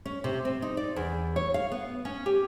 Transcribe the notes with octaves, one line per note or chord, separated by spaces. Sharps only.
C#4
C3
C4
D#4
D5
E2
C#5
F5
B3
C#4
G4